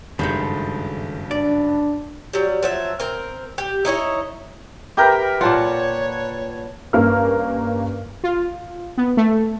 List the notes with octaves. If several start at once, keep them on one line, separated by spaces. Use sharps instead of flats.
F#1 G2 D#3 G#3 A3 G6
D4 D5
F#3 G3
F3 F#3 E5
C4 A#4
G4
D#4 E4 C#5 D#5
G4 A#4 B4 E5 G5 A#5 G6
A#2 F4 C#5 F#5 A5
G2 A#3 C#4 A#4 F6
F4
B3
A3